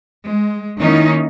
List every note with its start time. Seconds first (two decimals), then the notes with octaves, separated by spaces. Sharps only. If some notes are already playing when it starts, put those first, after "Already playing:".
0.25 G#3
0.79 D#3 A#3 C#4 D#4 E4